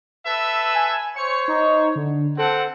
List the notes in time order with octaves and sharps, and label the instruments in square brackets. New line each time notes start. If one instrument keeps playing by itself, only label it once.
[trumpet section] A4 B4 E5
[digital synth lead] G#5
[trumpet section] C5 C#5 [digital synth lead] C#7
[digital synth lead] D#4
D3
[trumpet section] C4 F#5 [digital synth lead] A4